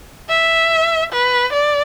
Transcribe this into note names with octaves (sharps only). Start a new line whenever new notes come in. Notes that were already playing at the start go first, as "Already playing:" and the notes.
E5
B4
D5